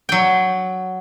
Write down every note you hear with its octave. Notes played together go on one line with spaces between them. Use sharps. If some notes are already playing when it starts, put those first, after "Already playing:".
F#3 G5